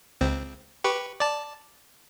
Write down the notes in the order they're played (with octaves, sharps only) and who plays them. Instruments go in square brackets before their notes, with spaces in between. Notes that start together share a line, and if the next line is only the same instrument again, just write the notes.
[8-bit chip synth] C#2 C4
G4 B4 C#6
D5 A5